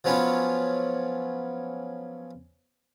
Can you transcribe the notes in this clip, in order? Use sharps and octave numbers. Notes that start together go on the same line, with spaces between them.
F3 F#3 B3 C#4 F4